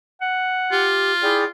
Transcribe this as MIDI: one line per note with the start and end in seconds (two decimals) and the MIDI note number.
0.21 0.88 78
0.72 1.51 65
0.72 1.12 67
1.23 1.44 64
1.23 1.44 68
1.23 1.44 74
1.23 1.44 79